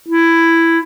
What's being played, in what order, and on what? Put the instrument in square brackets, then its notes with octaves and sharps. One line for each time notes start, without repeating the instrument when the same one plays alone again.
[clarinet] E4